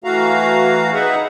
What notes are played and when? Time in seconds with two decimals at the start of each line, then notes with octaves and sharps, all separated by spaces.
0.04 E3 A3 F#4 F5 A#5
0.93 D#4 G#4 B4 E5 F#5